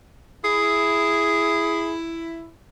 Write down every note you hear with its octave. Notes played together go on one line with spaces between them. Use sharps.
E4 G#4